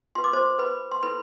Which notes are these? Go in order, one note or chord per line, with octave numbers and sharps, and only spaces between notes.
F4 B4 C6
D6
C5 C6
B4 B5
C6
E4 A4 B4 C5 B5